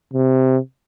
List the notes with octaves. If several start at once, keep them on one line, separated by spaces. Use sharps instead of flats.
C3